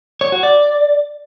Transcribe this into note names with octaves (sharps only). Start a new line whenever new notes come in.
C#5
F#4
D5